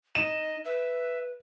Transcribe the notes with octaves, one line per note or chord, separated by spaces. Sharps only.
D#4 D#5 E7
B4 E5